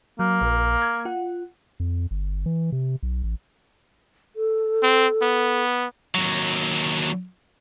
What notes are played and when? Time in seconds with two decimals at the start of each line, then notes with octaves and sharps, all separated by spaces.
0.19 F#3 A#3
0.41 A#1
0.82 G#6
1.05 F4 F#5
1.80 F2
2.11 G1
2.46 E3
2.72 C3
3.03 B1
3.23 A1
4.36 A4
4.83 C4
5.22 B3
6.15 D#2 F#3